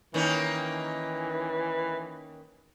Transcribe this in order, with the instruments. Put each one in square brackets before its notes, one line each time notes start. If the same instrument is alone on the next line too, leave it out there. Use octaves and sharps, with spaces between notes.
[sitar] D#3 A#3 C#4 [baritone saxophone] E3